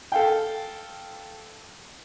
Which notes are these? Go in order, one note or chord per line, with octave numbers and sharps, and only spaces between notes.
A4 F5 G5